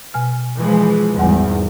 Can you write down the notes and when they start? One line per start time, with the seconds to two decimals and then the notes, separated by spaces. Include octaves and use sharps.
0.14 B2 G#5 F6
0.57 E3 F3 G#3
1.17 G#1 E2 G#2 G3 F#5 G#5